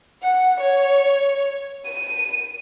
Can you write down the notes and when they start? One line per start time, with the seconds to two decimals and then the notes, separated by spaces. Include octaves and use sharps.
0.22 F#5
0.60 C#5
1.84 D#7